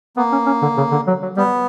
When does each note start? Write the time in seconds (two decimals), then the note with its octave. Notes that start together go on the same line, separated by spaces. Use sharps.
0.17 A#3 B3
0.32 C#4
0.46 C#4
0.62 D3
0.77 C#3
0.92 D3
1.07 F#3
1.22 F#3
1.36 G3 B3